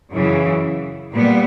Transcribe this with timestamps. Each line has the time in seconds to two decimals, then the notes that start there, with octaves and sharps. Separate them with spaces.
0.11 F#2 C#3 E3
1.12 A#2 G3 B3